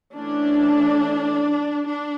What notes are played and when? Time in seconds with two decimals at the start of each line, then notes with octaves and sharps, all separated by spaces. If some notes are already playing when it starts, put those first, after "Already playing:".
0.16 E3 A3 C#4 D4
1.86 D4